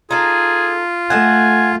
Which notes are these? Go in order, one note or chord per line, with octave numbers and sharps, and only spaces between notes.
D#4 F4 G#4 A4
A3 A4 D#5 F#5 G#5